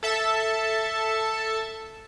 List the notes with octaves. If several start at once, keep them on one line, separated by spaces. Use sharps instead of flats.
A4 E5 A5